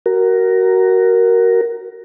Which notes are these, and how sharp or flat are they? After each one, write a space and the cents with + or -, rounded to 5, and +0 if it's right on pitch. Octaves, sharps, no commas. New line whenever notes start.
F#4 +20 A#4 +0